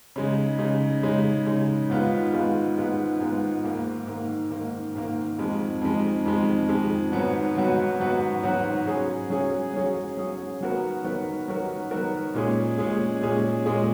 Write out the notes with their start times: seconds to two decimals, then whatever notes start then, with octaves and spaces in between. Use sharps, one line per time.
0.16 C#3 G#3 D#4
0.59 C#3 G#3 D#4
1.03 C#3 G#3 D#4
1.46 C#3 G#3 D#4
1.90 G#2 D#3 G#3 B3 F4
2.33 G#2 D#3 G#3 B3 F4
2.77 G#2 D#3 G#3 B3 F4
3.20 G#2 D#3 G#3 B3 F4
3.64 G#2 D#3 A#3
4.07 G#2 D#3 A#3
4.50 G#2 D#3 A#3
4.95 G#2 D#3 A#3
5.38 F2 D#3 G#3
5.81 F2 D#3 G#3
6.25 F2 D#3 G#3
6.69 F2 D#3 G#3
7.12 G#2 D#3 F#3 B3 F#4
7.55 G#2 D#3 F#3 B3 F#4
8.00 G#2 D#3 F#3 B3 F#4
8.43 G#2 D#3 F#3 B3 F#4
8.86 F#3 C#4 G#4
9.30 F#3 C#4 G#4
9.74 F#3 C#4 G#4
10.17 F#3 C#4 G#4
10.61 D#3 F#3 B3 F#4 A#4
11.04 D#3 F#3 B3 F#4 A#4
11.48 D#3 F#3 B3 F#4 A#4
11.91 D#3 F#3 B3 F#4 A#4
12.34 A#2 G#3 C#4 G#4
12.78 A#2 G#3 C#4 G#4
13.21 A#2 G#3 C#4 G#4
13.66 A#2 G#3 C#4 G#4